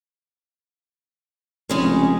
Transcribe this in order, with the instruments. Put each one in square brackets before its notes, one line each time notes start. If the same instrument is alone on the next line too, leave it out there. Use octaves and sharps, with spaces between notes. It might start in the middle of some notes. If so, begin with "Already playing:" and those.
[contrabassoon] F1 [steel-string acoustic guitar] C#3 G#3 C#4